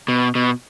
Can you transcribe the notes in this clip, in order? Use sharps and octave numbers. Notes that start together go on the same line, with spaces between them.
B2
B2